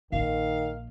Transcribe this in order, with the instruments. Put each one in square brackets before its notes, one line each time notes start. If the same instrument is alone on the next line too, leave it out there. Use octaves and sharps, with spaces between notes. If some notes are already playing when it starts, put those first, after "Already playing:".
[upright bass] A#1 [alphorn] D#3 [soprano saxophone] F5